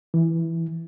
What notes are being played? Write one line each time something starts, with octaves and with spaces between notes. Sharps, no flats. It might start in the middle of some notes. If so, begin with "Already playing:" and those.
E3